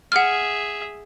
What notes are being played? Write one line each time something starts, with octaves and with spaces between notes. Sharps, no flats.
G#4 E5 F#5 F6